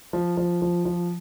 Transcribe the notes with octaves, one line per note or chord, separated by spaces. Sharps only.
F3
F3
F3
F3